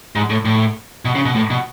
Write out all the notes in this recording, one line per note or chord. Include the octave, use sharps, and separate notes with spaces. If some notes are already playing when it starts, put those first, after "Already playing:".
G#2
A2
A2
B2
C#3
B2
A2
B2